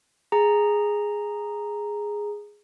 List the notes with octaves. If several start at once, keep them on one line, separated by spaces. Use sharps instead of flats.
G#4 A#5